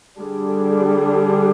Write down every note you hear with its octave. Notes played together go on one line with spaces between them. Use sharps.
D3 G3 D4 G#4